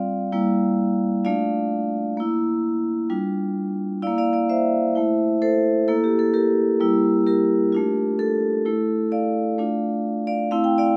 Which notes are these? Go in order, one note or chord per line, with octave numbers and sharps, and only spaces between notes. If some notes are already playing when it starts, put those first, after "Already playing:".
Already playing: G3 C4 F4 D5 F5
G3 A#3 E4
A3 D4 F4 D5 F5
A#3 E4
G3 D4 F4
A#3 E4 D5 F5
D5 F5
D5 F5
C5 E5
A3 E4
A4 C5
A#3 E4 A4
G4
A4
G4 A#4
G3 A#3 E4
G4 A#4
A3 D4 F4
A4
A3 E4
D5 F5
A3 D4 F4
D5 F5
A3 C4 E4 F5
G5
D5 F5